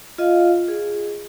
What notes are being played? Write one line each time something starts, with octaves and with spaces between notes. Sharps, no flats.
F4 D#5 F5
G#4